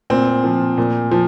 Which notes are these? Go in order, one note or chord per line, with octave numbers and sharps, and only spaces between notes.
A#2 C4
F3
A#2
F3